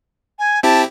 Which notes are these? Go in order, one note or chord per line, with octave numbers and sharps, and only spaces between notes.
G#5
C4 E4 G4 A5